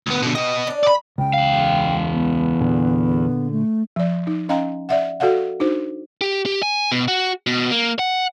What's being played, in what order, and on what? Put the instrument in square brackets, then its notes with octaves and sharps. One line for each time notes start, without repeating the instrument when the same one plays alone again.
[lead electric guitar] D2 B3
B2 D3
[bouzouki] B2 G4 [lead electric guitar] B3 D#5
[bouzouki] C#4 D4
[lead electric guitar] D5 B5
[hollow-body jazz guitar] C#2 C#3 [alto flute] G5
[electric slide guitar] E2 F5
[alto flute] B3
[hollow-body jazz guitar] A#2 D3 G#4
[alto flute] A3
[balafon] F3 D5
D#4
C#4 D#5 F5 G5 A#5
D5 E5 F#5
F#4 A4 D5 F5 F#5
D4 D#4 F#4 C5
[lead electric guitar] G4
G4
G#5
B2
F#4
B2
A#3
F#5